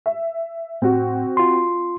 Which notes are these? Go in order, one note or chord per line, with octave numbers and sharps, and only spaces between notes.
E5
A2 C4 F#4
F4 C6